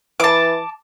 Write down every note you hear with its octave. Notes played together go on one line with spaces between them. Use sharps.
E3 A5 D6